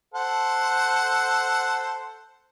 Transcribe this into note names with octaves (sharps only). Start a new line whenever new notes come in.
A4 C5 F#5